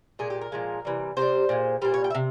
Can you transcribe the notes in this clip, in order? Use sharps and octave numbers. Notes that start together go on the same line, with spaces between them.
A#2 G#3 G#4
G4
A#4
A#2 F3 G#3
C3 E3 G3
C3 G3 C5
A#2 G#3
A#2 G3 C5
C#5
G5
E5
C3